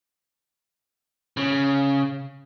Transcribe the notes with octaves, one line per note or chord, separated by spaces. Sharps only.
C#3